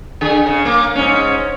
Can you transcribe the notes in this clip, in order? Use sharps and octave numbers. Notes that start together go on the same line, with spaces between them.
D3 G#4
C#3
A#3
G#2 C#4